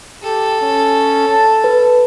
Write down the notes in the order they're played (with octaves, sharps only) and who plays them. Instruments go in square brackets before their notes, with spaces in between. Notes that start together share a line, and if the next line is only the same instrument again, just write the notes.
[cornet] G4 [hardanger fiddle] A4
[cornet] C#4
A5
[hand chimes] B4